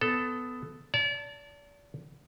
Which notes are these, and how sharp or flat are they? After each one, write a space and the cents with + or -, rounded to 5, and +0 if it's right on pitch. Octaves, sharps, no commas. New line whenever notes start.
B3 +20 A4 +0
D5 -35 A5 +20